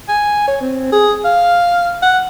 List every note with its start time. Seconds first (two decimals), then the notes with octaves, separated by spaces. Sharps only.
0.09 G#5
0.48 C#5
0.61 C4
0.92 G#4
1.25 F5
2.02 F#5